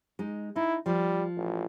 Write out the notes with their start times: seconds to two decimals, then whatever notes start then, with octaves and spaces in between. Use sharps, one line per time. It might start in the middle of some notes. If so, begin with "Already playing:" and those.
0.19 G#3 D#4
0.56 D#4 E4
0.86 F3 G3
1.37 A1